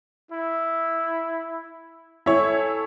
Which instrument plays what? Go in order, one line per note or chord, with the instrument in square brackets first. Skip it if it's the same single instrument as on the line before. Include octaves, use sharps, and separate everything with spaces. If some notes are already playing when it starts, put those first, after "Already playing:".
[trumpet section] E4
[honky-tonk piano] E4 C#5 [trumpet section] A4 G#5